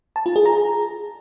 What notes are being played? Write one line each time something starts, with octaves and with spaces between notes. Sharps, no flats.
A5
F4
G#4
A#5